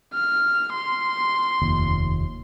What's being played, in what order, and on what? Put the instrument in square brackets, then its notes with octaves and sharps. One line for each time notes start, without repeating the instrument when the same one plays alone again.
[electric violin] F6
C6
[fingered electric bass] F1 D#2